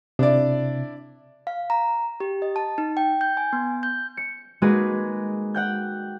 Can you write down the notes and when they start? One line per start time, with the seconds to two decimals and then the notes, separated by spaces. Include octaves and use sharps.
0.19 C3 D4 E4 D5
1.47 F5
1.70 A#5
2.20 G4
2.42 D#5
2.56 A5
2.78 D#4
2.97 G5
3.21 G6
3.37 G#5
3.53 B3
3.83 G6
4.17 C#7
4.62 G#3 A#3 D#4 F#4 G#4 B4
5.54 F#5 G5 G6